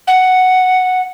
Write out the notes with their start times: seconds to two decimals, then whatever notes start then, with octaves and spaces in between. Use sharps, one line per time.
0.07 F#5